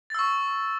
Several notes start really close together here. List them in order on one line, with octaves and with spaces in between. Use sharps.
A6 E6 C#6